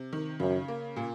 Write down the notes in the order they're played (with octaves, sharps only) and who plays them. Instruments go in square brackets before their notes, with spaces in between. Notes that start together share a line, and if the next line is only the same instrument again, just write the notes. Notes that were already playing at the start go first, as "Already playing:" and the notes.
Already playing: [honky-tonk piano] C3
D#3
[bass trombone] F#2 [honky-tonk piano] C#3
[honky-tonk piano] A#3
A#2